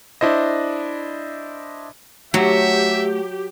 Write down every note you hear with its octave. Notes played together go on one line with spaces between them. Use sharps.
D4 E4 C5 D#5
F#3 A3 G4 E5 F#5